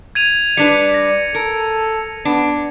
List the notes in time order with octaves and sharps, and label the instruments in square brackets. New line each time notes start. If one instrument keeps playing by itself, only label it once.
[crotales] G#6 D#7 F7
[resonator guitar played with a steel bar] G3 D4 B4 [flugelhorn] D5 [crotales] C#7
[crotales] A#6
[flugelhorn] A4 [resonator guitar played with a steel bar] A#4
[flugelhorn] B3 [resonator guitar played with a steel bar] D4